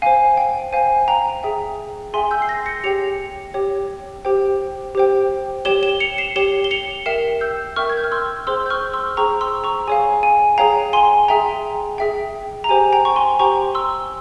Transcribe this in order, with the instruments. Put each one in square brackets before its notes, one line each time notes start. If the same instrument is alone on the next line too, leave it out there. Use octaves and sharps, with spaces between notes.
[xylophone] C5 F5 G#5
G5
C5 F5 G#5
G5 A#5
G#4 E5 G5
G#4 E5 G5 G#5 C6
E6 G6
C7
G6 A#6
A#6 C#7
G4 C#5 G5 C#7 F7
G4 C#5 G5
G4 C5 G5
G4 C5 G5
G4 C#5 G5 E7 G7
E7 G7
C#7 F7
C7 E7
G4 C#5 G5 E7 G7
G7
C#7 F7
A#4 E5 G5 C7 E7
E6 G6
A#4 E5 G5 C#6 F6
G#6
G6
F6
C6 E6
G#4 C5 G5 C6 E6
G6
C#6 F6
C6 E6
G#4 C5 G5 A#5 C#6
C6 E6
A#5 C#6
G#4 C#5 F5 G#5
G#5
G#4 C#5 F5 G5 A#5
G#5 C6
G#4 E5 G5 A#5
G#4 E5 G5
A#5
G4 C5 G5 G#5
G5 A#5
C#6
G#5 C6
G4 C5 G5 A#5 C#6
C6 E6